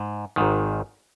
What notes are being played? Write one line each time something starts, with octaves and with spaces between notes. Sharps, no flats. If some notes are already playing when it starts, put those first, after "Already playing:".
Already playing: G#2
G#1 G#2 D#3